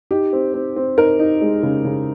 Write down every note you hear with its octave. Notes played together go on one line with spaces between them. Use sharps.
D#4 G4
C4
C4
C4
D#4 A#4
D#4
G#3
C#3
C#3